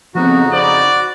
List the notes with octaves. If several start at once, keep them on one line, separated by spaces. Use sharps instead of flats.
F2 C#3 F3 B3 C4 D#4 F#4
C5 D5 B5